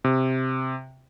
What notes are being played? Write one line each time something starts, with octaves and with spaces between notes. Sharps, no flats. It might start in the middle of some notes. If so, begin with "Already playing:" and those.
C3